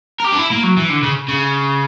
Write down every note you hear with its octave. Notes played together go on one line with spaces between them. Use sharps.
A#4
G4
D4
E4
A#3
F#3
E3
D3
C#3
C#3